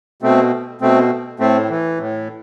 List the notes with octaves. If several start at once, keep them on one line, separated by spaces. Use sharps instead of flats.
B2 A3 C4
B2 A3 C4
A2 A3 C4
E3
A2